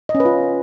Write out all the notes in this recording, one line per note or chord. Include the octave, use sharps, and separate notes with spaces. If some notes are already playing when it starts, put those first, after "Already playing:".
D#5
C#4
B4
F4